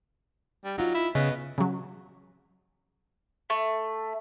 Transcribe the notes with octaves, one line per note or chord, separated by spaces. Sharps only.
G3
F#3 D#4 F4
E4
C#3 B3 D#5
C#3 F#3
A3